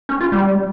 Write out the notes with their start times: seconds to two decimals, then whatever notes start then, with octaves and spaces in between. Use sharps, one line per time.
0.09 C#4
0.21 F4
0.32 G3